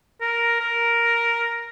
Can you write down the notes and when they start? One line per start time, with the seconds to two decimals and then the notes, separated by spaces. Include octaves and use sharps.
0.21 A#4
0.60 A#4